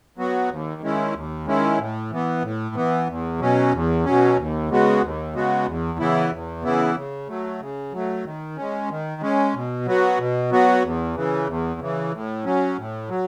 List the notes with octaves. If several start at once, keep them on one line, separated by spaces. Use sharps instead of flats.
F#3 B3 F#4
D#2
D#3 G#3 C#4 E4
D#2
D#3 G#3 C#4 E4
A2
E3 B3
A2
E3 B3
E2
B2 F#3 C#4
E2
B2 F#3 C#4
D#2
C#3 G#3 B3 F#4
D#2
C#3 G#3 B3 F#4
E2
C#3 E3 B3 E4
E2
C#3 E3 B3 E4
C#3
F#3 A3
C#3
F#3 A3
D#3
G#3 C#4
D#3
G#3 C#4
B2
F#3 B3 F#4
B2
F#3 B3 F#4
E2
C#3 E3
E2
C#3 E3
A2
F#3 C#4
A2
F#3